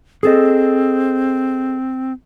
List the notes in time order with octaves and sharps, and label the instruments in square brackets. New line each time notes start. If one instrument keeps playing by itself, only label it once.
[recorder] C4 [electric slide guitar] G#4 A4 D#5